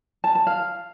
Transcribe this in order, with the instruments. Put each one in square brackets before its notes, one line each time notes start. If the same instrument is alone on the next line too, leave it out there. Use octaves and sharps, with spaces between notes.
[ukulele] A5
A5
F5